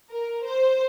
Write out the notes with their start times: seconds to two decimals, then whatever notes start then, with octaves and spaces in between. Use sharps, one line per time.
0.11 A#4
0.44 C5